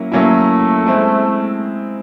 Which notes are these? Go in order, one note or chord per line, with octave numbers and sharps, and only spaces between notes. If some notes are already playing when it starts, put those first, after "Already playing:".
Already playing: F#3 A#3 C#4 E4
F#3 A3 A#3 C#4 E4
G#3 C4 E4